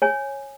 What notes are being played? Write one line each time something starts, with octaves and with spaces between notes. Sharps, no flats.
C#5 G#5